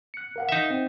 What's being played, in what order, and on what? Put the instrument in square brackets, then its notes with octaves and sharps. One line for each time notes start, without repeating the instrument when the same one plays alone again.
[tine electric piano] F#6 C#7
A#4 F5 F#5
[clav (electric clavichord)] D#4 E5
[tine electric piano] C4